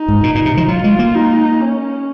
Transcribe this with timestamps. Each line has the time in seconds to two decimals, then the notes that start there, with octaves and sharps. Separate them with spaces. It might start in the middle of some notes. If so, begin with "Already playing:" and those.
Already playing: D#4
0.08 G#2
0.23 A#2
0.35 A#2
0.45 C3
0.57 F3
0.68 F#3 F4
0.84 G#3
0.99 A#3
1.14 D#4
1.61 C#4